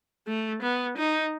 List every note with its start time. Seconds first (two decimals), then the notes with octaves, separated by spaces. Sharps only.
0.28 A3
0.62 B3
0.97 D#4